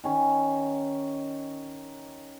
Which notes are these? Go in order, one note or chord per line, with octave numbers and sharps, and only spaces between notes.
D#3 C#4